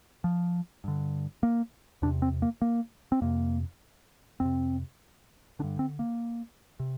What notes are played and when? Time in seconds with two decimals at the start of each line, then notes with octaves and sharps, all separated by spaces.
0.24 F3
0.84 G2 D3
1.43 A#3
2.02 E2 C3 D4
2.22 C4
2.42 A#3
2.62 A#3
3.12 C4
3.21 F2 C3 A#3
4.40 F2 C3 C4
5.59 D3 D4
5.64 G2
5.79 C4
5.99 A#3
6.80 C3